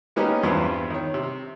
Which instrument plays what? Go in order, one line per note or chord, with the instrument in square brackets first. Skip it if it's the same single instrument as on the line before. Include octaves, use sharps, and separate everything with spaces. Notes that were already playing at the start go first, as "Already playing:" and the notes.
[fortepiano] G#3 A#3 B3 C#4 D#4 G4
E2 G2 F3 G3 B3 C4
D#3 C#5
C3